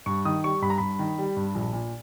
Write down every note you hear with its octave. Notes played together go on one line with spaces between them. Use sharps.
G2 C#6
D#3 D#6
G3 C#6
G2 B5
A#5
G2 B5
D#3
G3
G2
A#1
A#2